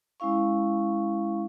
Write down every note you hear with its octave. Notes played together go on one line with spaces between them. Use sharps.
G#3 C#4 E4 F5 C#6